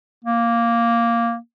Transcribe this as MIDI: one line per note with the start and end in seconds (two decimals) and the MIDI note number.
0.25 1.36 58